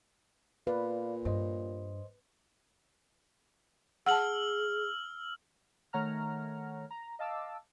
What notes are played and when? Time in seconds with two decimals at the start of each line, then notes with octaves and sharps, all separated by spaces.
0.67 A#2 B4 D5 F5
1.25 G2 C5 D#5 C6
4.06 G#4 F#5 A5 E6 F6 F#7
5.93 D#3 A3 C#5 F#5 A#5 F6
6.91 A#5
7.19 D#5 F5 A5 D6 E6